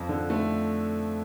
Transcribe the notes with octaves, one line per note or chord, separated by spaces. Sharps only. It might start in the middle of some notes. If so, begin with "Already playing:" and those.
Already playing: F2
D3
A3